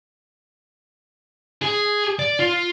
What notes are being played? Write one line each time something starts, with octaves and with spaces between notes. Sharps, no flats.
G#4
D5
F4